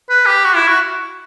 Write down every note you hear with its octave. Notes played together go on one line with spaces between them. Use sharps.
B4
G4
F#4
E4
F#4